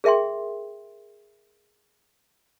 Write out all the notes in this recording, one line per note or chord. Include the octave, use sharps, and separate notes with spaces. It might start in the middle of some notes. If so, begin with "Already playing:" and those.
G#4 A#4 E5 G5 C6